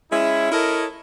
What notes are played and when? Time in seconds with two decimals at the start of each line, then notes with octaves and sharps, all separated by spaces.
0.11 G#3 C#4 E4
0.52 E4 A4 A#4 C#5 D#5